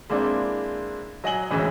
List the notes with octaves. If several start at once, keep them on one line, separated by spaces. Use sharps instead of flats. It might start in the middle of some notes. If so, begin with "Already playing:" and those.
G#3 A#3 C4 D4 E4
F#3 D#5 G#5 F#7 G7
D2 A2 E3 G#3 C#4